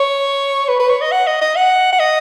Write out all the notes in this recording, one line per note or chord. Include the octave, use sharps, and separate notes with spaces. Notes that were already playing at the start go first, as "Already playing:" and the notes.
Already playing: C#5
B4
B4
C#5
D#5
F#5
D#5
D#5
F#5
F#5
D#5